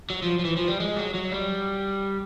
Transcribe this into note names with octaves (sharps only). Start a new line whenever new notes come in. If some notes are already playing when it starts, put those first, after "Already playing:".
F#3
F3
F3
E3
F3
G3
G#3
F#3
F#3
G3